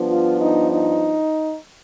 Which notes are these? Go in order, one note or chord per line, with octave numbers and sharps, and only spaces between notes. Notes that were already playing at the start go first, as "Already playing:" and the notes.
Already playing: G2 F3 B3 D4
F4
D#4
D#4